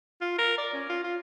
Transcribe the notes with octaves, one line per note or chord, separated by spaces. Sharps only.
F4
A#4
D5
C#4
F4
F4